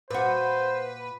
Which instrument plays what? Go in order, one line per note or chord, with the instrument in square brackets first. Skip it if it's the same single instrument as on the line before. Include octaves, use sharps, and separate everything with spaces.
[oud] A#2 F#4 [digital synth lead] B4 [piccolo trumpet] C5